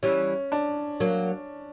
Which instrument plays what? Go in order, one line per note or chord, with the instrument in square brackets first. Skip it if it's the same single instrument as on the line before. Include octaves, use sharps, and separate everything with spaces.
[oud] E3 G3 [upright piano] C#4
[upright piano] D4
[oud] F#3 A#3